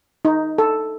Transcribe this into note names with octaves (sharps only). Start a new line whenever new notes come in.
D#4
A4